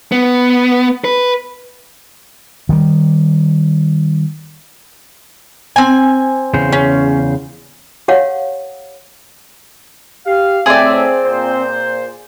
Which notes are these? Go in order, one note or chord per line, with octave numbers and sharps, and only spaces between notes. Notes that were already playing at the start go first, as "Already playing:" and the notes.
B3
B4
D#3 G3
C4 G#5
E2 C#3 C5
C#4
G4 C#5 F5 F#5
G4 F5
A2 A3 C4 G#4 D5 E5
A#2 C5